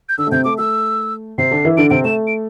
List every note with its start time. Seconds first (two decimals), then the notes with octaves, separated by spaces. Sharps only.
0.09 G6
0.18 D3 D4 E6
0.27 A3
0.31 C3 C4 G6
0.44 A3 D6
0.58 A3 E6
1.38 C3 C4 C7
1.51 D3 D4
1.65 E3 E4
1.77 D3 D4 D7
1.90 C3 C4 D7
2.04 A3 E7
2.27 D7